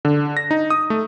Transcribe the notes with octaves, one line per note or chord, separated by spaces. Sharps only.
D3
A#6
D#4
D#6
A3